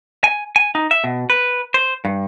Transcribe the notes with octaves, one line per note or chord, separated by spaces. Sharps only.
G#5
G#5
D#4
E5
B2
B4
C5
G2